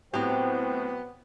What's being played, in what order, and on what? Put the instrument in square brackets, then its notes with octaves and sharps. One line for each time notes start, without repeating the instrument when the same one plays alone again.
[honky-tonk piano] A2 [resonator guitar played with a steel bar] F#3 G4 [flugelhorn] B3 [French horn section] C4